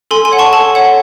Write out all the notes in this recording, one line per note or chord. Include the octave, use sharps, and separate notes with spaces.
A4 G#5 C6
G#5 C6
C#5 F#5
A5 C#6
A4 A5
C#5 F#5